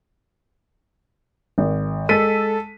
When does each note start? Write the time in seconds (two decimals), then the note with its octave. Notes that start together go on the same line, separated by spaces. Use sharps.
1.58 G#1
2.09 G#3 A4 B6 D#7